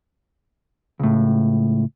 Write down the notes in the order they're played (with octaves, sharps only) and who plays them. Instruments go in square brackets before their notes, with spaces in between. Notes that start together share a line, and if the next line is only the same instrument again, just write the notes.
[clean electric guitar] C#2 A2